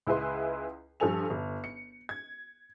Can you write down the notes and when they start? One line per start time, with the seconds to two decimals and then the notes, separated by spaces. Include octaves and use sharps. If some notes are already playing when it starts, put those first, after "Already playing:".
0.07 C#2 E4 G#4 B4 C6
1.00 G2 F3 G3 A4 G#5 F7
1.30 G1
1.64 C#7
2.09 G#6